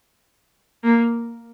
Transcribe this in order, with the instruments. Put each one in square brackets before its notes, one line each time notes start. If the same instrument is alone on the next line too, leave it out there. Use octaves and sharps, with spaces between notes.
[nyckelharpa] A#3